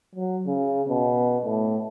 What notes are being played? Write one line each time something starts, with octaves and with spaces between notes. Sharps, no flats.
F#3
C#3
B2
A2